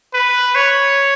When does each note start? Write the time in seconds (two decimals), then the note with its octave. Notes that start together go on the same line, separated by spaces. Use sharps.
0.14 B4
0.55 C#5